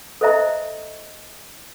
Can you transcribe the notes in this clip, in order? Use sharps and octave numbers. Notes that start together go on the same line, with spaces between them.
A4 C5 D#5 E5 A#5